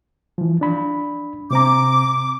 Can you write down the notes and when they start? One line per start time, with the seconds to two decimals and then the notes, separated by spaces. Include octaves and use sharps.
0.38 E3 F3
0.61 D4 B5
1.51 C3 C4 A#5 D6